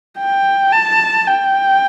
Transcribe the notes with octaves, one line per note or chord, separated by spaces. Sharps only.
G5
A5
G5